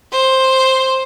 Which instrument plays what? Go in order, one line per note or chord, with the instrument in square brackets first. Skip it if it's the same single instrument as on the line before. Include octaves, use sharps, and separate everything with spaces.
[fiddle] C5